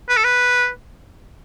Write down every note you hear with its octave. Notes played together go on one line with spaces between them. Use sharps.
B4
A4
B4